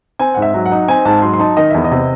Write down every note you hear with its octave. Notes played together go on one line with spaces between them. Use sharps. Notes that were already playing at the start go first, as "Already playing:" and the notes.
C4 G#5
G#2 F#5
E5
F#3
F#5
D#4
C4 G#5
G#2 A5
F#3 C6
C6
D#4 A5
D#3 D#5
E2 E5
D#5
C3